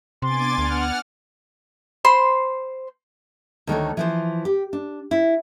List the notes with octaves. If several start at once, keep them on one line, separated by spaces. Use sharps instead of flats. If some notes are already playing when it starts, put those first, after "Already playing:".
C3 B3 D4 G#5 C6 D6 A6
D2 F#5 F6
C5 B5 C6
D2 D#3 A3 C#5
E3 F3 C5
G4
D4
E4